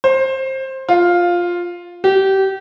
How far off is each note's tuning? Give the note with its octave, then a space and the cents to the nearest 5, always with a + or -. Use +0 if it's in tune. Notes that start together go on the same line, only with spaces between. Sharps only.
C5 +20
F4 +5
G4 -25